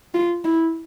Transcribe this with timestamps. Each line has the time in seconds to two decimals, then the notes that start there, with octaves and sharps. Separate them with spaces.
0.14 F4
0.44 E4